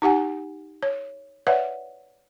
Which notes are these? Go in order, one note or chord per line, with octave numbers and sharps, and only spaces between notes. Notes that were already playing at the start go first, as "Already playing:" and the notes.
D#4 G4 F#5 G#5
C#5
B4 C#5 D5 E5 F#5